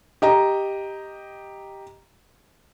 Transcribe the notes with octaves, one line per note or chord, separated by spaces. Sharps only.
G4 D#5 A#5